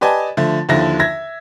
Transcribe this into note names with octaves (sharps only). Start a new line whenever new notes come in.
G4 B4 D5 D#5 G#5 A5
D3 F3 A3
D#2 D3 F3 E4 A#6
E5 G#6 A#6